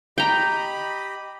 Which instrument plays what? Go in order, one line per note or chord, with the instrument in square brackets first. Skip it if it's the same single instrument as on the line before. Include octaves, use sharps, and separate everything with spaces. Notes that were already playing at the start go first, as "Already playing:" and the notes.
[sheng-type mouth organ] G4 D#5 B5 [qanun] G5 A#5